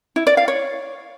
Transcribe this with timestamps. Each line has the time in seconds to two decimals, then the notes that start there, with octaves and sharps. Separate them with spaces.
0.16 E4
0.27 D5
0.37 F5
0.48 C#5